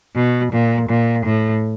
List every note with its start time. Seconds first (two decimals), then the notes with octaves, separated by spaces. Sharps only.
0.16 B2
0.52 A#2
0.89 A#2
1.25 A2